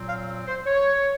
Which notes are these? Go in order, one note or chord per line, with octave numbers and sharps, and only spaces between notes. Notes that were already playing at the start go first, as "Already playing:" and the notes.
Already playing: A#2 F#3 C4
F5
C5
C#5